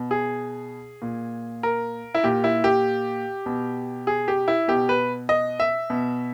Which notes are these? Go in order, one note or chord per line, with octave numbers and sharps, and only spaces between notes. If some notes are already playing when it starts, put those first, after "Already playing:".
Already playing: B2
G#4
A#2
A#4
E4
A#2 G4
E4
G4
B2
G#4
G4
E4
B2 G4
B4
D#5
E5
B2